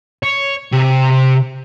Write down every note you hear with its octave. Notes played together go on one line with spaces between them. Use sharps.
C#5
C3